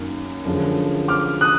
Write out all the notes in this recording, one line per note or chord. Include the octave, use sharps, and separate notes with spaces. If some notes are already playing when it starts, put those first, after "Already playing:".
Already playing: F#2 D#3 A#3
F#2 D3 F3 G#3
D6 F6
D#6 F#6